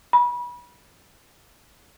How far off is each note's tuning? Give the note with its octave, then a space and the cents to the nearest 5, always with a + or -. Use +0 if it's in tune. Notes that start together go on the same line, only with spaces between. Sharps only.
B5 -30